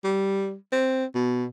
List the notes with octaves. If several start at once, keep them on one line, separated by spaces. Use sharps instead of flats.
G3
C4
B2